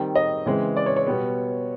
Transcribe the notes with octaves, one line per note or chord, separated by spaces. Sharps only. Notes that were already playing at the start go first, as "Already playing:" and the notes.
Already playing: D#3 G3 C4
D#5
C#3 E3 G#3 C4
D5
C#5
C#5
B2 G3 B3